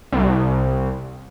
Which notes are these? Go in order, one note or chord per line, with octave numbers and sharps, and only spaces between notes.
C2